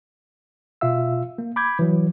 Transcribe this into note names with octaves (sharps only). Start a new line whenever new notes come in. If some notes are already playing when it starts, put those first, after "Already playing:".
B2 F4 E5 F5 E6
A#3
B5 D6 G6 G#6
E3 F#3